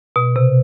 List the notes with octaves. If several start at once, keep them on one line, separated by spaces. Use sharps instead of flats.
B2
C3